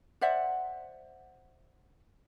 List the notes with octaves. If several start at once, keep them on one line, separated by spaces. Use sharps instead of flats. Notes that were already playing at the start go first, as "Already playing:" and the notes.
C5 D5 E5 F#5